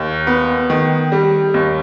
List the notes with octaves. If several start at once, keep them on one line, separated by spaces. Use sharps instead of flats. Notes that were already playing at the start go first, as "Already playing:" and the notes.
Already playing: D#2
B3
D#3
G3
D#2